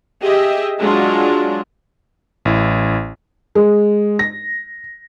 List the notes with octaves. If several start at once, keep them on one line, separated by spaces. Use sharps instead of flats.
G4 G#4 D#5 E5
F#3 G#3 D4 F4
A1 E4
G#3
A#6